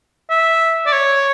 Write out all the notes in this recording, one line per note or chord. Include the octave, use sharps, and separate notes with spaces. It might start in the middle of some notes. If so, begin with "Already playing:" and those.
E5
D5
C#5